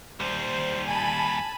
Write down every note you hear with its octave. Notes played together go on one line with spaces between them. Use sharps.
D#2 G3 C5
G#5 A5 B5